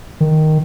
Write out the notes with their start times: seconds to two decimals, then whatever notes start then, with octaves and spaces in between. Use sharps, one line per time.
0.21 D#3